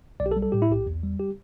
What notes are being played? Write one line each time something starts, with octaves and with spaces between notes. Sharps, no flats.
B1 D5
G4
A4
G3
A4
A2 G4
E4
B1 G4
E2
G3
G4